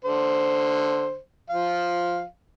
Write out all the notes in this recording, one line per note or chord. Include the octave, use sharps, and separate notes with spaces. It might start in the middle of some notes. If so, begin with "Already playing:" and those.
D3 C5
F3 F5